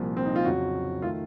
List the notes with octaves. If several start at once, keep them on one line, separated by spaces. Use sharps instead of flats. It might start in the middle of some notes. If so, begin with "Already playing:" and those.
Already playing: C2 A#2 F3
C4
D#4
F4
F2 C#3 F#3 F#4
D#3 A3 F4